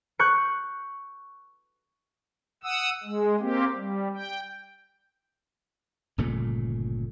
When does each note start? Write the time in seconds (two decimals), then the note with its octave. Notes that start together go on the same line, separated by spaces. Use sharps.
0.19 C#6 F#6 G6 C#7
2.63 F#5 D#6 E6
3.04 G#3
3.40 A#3 C4 G4
3.76 G3
4.15 G5
6.18 G1 A#2 C#3 A3